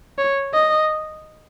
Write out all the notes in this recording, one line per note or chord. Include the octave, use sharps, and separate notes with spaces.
C#5
D#5